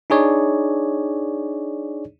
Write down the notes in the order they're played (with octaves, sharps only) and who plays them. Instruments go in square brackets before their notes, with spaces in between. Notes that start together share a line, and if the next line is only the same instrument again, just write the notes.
[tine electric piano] D4 D#4 G#4 C#5 D5